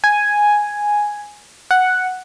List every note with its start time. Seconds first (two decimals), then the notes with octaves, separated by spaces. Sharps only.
0.04 G#5
1.71 F#5